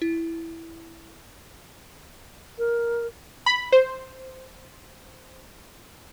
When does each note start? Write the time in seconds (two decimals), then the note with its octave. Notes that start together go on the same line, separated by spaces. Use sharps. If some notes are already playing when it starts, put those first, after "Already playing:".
0.02 E4
2.58 A#4
3.46 B5
3.72 C5